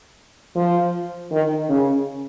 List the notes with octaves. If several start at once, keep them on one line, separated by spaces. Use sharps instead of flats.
F3
D#3
C#3